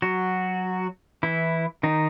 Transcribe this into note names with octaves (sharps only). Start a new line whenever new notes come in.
F#3 F#4
E3 E4
D#3 D#4